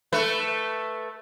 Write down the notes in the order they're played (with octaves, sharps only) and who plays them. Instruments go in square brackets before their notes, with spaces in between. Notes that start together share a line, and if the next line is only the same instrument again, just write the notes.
[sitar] A3 B4